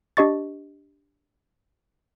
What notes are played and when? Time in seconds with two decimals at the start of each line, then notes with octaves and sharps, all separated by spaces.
0.17 D4 G4 D#5 C#6 A6